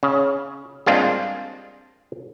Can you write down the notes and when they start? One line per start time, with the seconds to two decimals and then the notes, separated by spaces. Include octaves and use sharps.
0.03 C#3
0.86 G3 G#3 A#3 C4 D4 F4